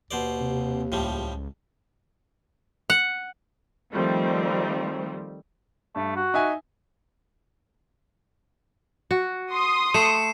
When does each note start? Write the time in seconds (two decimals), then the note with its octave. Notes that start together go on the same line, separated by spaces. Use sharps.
0.11 D#2 B2 C5 D5
0.40 C3
0.92 C#2 A2 F3 G3
2.90 F#5
3.93 D#3 F3 G3 A3 C4
5.96 G2 A3
6.16 F#4
6.34 D#4 E5 G#5
9.11 F#4
9.52 C6 D#6
9.94 A3 C7 C#7 E7